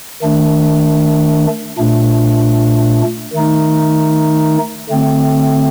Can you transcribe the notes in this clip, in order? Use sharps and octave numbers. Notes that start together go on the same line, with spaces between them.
D#3 A3 D4
A#2 A3 D4
D#3 A3 D#4
D3 A3 C4